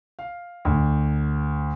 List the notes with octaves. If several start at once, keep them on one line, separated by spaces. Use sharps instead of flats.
F5
D2